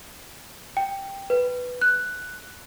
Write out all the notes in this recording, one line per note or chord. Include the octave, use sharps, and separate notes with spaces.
G5
B4
F#6